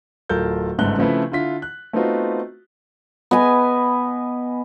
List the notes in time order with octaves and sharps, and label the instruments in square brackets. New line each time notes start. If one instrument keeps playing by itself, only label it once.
[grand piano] D1 F4 A4 A#4 G6
G1 G#2 C#3 A3 F#6 G7
C#3 F3 A3 C4 E4 B4
D3 E4 F4 B6
F#6
A3 B3 C4 D#4 F4 F#4
[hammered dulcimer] B3 B4 D#5 G#5